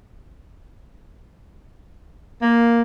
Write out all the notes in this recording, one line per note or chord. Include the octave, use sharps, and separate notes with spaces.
A#3